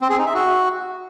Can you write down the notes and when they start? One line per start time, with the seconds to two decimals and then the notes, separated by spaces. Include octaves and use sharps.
0.01 C4
0.10 G#4
0.18 D#4
0.26 E5
0.34 F#4